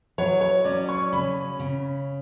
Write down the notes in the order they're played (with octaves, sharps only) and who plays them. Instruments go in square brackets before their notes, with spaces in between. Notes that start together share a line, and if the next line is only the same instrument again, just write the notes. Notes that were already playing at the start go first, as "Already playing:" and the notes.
[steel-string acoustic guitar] F#3 [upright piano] C#5
[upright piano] C#5
[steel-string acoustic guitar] C#4 [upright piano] D5
[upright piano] C#6
[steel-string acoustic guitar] C#3 [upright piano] B5
[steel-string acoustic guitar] C#3